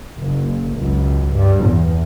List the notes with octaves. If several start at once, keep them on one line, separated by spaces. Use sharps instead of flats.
F#1
C#2 F#2
G2
E2